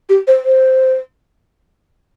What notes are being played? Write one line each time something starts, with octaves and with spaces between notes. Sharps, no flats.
G4
C5
C5